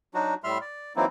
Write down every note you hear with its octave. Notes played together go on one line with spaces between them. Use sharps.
F#3 D4 D#4 F#4
A2 G3 E5 C6 F6
D5
E3 F#3 A#3 C4 D#4 E4